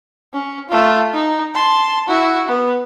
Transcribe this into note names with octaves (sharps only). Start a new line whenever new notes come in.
C#4
A3 F4
D#4
A5 C6
E4 F#4
B3